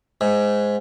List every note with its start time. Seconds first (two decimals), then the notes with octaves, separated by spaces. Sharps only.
0.21 G#2